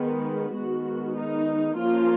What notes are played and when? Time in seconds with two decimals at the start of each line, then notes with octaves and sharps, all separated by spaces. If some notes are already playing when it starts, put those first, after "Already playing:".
Already playing: D#3 G#3 B3
0.54 D#3 G#3 B3 F#4
1.15 D#4
1.76 F3 A#3 C#4 F4